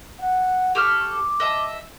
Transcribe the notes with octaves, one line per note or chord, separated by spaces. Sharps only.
F#5
G4 A4 C#6 F6
D6
D#5 E5 A5